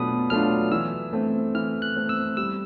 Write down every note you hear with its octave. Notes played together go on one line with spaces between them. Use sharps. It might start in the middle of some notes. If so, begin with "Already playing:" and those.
Already playing: B2 F#3 A3 D4 F4 B5 D#6
F#3 A3 D4 F4 F6
E3 E6
A3 C4
E3 F6
F#6
A3 C4
E6
G3 E6